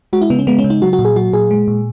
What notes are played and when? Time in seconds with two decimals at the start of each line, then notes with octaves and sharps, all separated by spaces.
0.13 G#3 F#4
0.22 E4
0.30 C#3 B3
0.39 C#4
0.47 G#3 B3
0.59 C#4
0.64 C#3
0.70 D#4
0.82 F#3 F#4
0.93 F#4
0.99 A#2
1.05 G#4
1.16 F#3 F#4
1.33 A#2 G#4
1.51 G#3
1.68 A#2